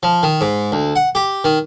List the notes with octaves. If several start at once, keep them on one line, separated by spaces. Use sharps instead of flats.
F3
D#3
G#2
D2
F#5
G4
D#3